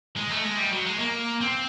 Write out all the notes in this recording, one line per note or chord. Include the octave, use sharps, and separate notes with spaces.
G#3
A3
G#3
G3
F#3
G#3
A#3
C4